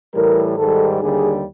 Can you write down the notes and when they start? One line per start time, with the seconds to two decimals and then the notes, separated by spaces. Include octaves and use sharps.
0.14 A2 E3 G3 A#4
0.57 G#2 D#3 G3 A4
1.01 D#2 D3 G3 G#4